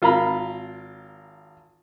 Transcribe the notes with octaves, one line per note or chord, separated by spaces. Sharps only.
G#1 F4 A#4 A#5 B5